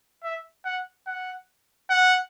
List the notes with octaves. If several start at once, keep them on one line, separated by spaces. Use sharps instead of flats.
E5
F#5
F#5
F#5